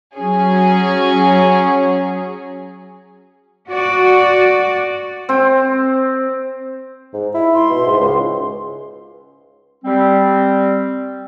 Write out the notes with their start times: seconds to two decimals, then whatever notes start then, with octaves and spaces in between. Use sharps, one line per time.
0.15 F#3 C#4 G#4
3.69 F#4 D5
5.29 C4
7.14 G#2
7.34 E4
7.54 C6
7.70 B2
7.86 G#2
8.00 C#2
9.85 G3 C4